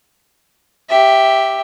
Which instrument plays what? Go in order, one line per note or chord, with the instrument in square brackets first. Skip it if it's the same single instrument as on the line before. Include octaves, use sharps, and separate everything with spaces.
[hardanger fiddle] G4 E5